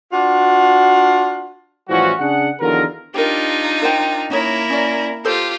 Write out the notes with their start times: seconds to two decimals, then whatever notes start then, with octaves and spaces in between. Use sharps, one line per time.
0.11 D4 F4 F#4
1.89 A2 E3 F3 G3 C#4 F#4
2.19 C#3 D4 G#4 F#5
2.60 E2 D3 D#3 F#3 F4 A#4
3.14 D4 D#4 F4 G4 A#4
3.82 A#4 C5 G5
4.30 A#3 C#4 D#4 E4 A#4 C#5
4.70 C#4 D5
5.25 F4 G4 A4 C5